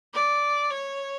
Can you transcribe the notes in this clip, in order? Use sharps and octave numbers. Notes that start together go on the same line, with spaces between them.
D5
C#5